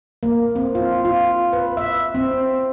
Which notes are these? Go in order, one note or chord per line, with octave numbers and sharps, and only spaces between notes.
A#3
C4
F4
F4
B4
E5
C4